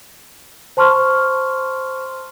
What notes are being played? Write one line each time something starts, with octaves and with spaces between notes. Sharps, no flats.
C5 A5 C6 C#6 F6